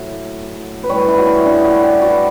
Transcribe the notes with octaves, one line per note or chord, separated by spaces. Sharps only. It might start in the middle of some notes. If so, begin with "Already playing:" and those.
Already playing: A2 F#3 A3
B4
A2 G3 C#5
E4
F#4
E4
D4
F#4
G4
F#4